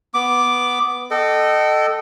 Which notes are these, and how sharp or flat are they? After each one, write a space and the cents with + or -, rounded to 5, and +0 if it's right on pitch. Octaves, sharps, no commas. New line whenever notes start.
B3 +0 D6 +0
A4 +0 D#5 -20 G5 -40